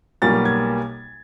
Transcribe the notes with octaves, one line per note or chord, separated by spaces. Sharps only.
B1 B2 G3 A#3 A6
G#6